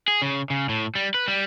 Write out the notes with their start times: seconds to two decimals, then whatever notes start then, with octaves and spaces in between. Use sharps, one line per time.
0.08 G#4
0.22 C#3
0.50 C#3
0.69 A2
0.95 G3
1.14 B4
1.28 G3